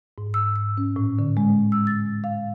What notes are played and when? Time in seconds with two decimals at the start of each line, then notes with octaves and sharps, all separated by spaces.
0.18 G#2
0.34 E6
0.56 E6
0.77 C#4
0.96 A2
1.19 D3
1.37 G#3
1.72 E6
1.87 A6
2.24 F5